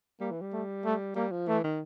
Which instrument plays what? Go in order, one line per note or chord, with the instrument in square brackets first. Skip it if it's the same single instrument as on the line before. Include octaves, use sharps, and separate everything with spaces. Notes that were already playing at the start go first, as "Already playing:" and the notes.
[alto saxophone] G3 [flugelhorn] A#3
[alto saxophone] E3
G3
[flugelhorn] A3
A3
[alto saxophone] G3 [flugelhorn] A#3
[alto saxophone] F3
[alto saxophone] E3 [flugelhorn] A3
[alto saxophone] D#3